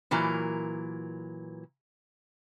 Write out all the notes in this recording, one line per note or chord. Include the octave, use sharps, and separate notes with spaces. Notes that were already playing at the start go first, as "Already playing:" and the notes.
A#2 E3 F#3 A#4